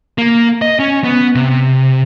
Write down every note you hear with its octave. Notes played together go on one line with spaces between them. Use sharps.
A#3
D#5
C#4
B3
C3